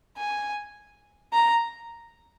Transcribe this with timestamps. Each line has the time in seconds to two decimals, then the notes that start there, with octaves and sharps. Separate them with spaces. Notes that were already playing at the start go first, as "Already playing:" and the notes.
0.17 G#5
1.33 A#5